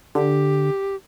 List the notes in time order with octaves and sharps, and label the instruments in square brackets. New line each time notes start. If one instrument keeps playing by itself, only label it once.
[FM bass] D3 [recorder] G4